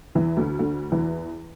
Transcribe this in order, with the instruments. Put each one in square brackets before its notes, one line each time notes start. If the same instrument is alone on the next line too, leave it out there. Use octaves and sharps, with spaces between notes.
[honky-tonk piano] E2 E3
D2 D3
D2 D3
E2 E3